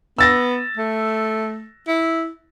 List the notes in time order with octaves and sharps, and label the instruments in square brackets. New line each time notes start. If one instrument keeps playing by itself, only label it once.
[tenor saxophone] B3 [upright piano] E6 A6 A#6
[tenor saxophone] A3
E4